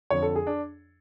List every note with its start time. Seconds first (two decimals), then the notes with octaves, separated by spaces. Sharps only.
0.10 F2 D3 F3 C#5
0.23 A4
0.36 G#4
0.47 D4